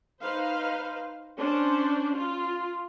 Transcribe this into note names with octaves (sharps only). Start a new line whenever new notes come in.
D#4 B4 C5 F5
C#4 D4 C5 D5
F4